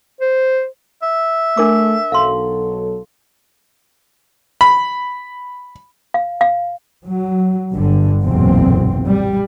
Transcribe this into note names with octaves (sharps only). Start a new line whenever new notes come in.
C5
E5
A3 D4 A#4 D6
B1 F#3 A4 F5 C6
B5
F5
F5
F#3
G1 G2 D3
F#1 B1 E2 A#2 F#3 C4
G3